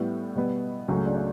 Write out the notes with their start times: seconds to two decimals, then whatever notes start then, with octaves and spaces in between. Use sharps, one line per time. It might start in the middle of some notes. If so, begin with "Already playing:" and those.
Already playing: A2 G3 B3 E4
0.35 B2 G3 B3
0.88 C#2 C#3 F#3 A3 C#4
1.06 D4
1.17 D4